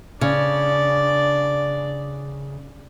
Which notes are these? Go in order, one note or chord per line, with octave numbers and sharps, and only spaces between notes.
C#3 D4 D5